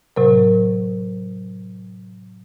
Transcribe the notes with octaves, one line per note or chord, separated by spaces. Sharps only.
A2 C3 F#3 A#4